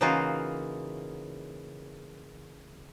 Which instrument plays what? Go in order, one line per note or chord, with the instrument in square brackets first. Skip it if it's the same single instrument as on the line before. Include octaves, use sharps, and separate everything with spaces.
[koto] C#3 E3 A#3 D#4 F4 F#4